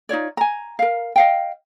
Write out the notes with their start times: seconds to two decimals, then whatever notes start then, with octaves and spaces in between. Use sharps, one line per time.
0.09 D#4 F4 C#5 D5
0.37 G#5 A#5
0.79 A#4 F5
1.16 D#5 F5 G5